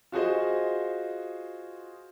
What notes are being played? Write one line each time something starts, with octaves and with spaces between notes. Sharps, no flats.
F4 F#4 G#4 C5 D#5